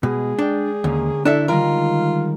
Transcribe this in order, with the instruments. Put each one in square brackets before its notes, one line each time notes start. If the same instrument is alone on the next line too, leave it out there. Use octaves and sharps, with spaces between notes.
[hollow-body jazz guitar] B2 [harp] G#3 [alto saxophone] G#4
[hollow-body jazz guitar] D4 [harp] D5 G5
[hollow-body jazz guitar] D#2 [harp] D3 A#3 C#4
[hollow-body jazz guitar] D4 A4 E5 [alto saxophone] E4
[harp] D#3 G3 G#3 [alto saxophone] F4 [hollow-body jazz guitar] A#4